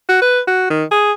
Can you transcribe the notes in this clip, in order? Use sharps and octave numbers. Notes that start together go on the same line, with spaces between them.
F#4
B4
F#4
D#3
G#4